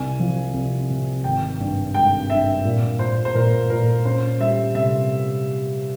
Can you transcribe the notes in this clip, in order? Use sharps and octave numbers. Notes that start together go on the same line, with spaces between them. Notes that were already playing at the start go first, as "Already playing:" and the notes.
Already playing: C2 G#5
F3
C2
C3
G#1 G5
G2
G#1 G5
G2 E5
A#2
A#2 C5
C5
A#2 A#4
A#2 A#4
C#4 C5
G3 E5
C3 E5